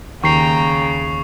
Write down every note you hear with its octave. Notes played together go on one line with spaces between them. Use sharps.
D#2 C#3 G5 A#5 C#6 C7 F7